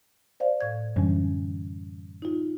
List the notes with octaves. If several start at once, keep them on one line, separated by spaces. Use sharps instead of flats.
C5 D5 F5
A2 G#6
F#2 D3 E3 G3 C#4
D#4 F4